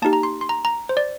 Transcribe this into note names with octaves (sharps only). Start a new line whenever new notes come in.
A#3 D#4 G4 A5
A#5
C6
C6
A#5
A#5
C5
D5